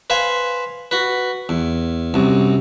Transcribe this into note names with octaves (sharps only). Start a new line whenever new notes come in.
B4 C5 F5 G#5
F#4 B4
E2
C2 F#2